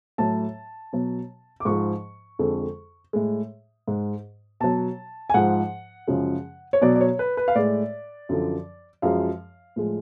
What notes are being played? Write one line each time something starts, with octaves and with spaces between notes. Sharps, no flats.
A2 F#3 A5
B2 F#3
D6
G#2 F3 G#3 C#6
F2 D3 G#3
A2 G#3
G#2 G#3
B2 F#3 A5
G#5
G#2 F3 G#3 F#5
F#2 C#3 F3 G#3
C#5
B2 F#3 D5
D5
C#5
B4
B4
F5
A2 G#3 D5
F#2 D3 F3
F#2 F3 G#3 F5
A2 F3 G#3